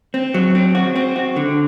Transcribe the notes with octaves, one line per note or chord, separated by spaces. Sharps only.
C4
F#3
C4
F#4
C4
F#4
D3